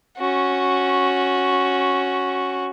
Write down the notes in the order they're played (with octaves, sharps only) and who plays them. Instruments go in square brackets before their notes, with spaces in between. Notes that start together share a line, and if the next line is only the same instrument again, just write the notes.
[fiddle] C#4 F#4